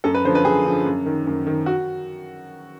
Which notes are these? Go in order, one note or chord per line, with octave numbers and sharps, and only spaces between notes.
F#2 A4
B4
D3 F3 C5
B4
F#2 G#4
D3 F3
F#2
D#3
F#2
D#3
F#4